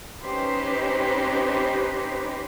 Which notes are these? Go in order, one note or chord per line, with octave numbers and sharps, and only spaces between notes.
C#4 D#4 G4 B4 C5